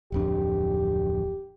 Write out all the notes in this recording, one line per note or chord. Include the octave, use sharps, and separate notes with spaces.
D1 F2 D4 G4